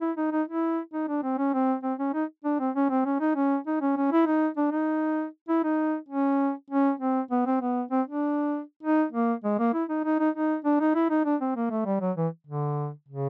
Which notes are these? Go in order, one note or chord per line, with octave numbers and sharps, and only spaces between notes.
E4
D#4
D#4
E4
D#4
D4
C4
C#4
C4
C4
C#4
D#4
D4
C4
C#4
C4
C#4
D#4
C#4
D#4
C#4
C#4
E4
D#4
D4
D#4
E4
D#4
C#4
C#4
C4
B3
C4
B3
C4
D4
D#4
A#3
G#3
A#3
E4
D#4
D#4
D#4
D#4
D4
D#4
E4
D#4
D4
C4
A#3
A3
G3
F#3
E3
D3
C#3